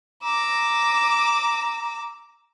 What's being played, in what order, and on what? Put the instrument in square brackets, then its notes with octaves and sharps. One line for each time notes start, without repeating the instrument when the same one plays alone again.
[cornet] A#5 [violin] D6 E6